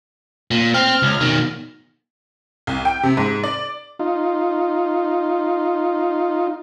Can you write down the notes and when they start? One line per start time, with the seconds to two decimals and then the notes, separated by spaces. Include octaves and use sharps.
0.51 A#2
0.74 C4 F6
1.02 C#2
1.21 B2 D#3
2.67 C2
2.85 G5
3.03 C3
3.17 G#2
3.44 D5
3.99 D#4 F4